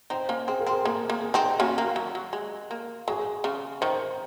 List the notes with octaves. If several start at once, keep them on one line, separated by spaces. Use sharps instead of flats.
C4 D#4 C5
A#3 C#4
C4 G#4
A#4
C4 G#4
A#3 A#4
A#3
G#4
C4 D#4
A#3 C#4 F#4
A#3
F#3
F#3
G#3
A#3
F#3 G#4
C#3
D#3 C5